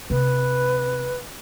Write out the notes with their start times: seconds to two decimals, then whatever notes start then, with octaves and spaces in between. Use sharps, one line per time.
0.10 C3 B4